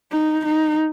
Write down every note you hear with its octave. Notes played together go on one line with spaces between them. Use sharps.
D#4
D#4